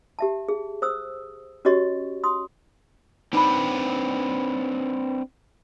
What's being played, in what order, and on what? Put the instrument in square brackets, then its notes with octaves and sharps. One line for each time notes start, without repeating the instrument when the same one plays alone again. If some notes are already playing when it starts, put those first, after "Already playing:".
[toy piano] G4 E5 A5
G#4
C5 D#6 E6
C#4 F#4 G4 C#5 D#5 C#6
C6 D#6
[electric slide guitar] C4 D4 B4 [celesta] D#4 B5